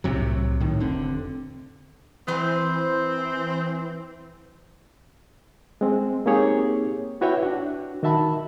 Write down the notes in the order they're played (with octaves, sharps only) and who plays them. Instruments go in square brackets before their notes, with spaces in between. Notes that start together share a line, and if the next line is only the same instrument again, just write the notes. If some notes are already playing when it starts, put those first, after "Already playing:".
[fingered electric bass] C2 A2 C3 F#3
A2 D#3
F1 D3 C4
[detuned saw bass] E3 [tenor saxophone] C4 [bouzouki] B4 C5
[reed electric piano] G#3 C4
A#3 C4 D#4 G4 G#4 C#5
E4 F#4 B4 C#5 E5 G5
D4 F#4
D#3 F#4 E5 A5 B5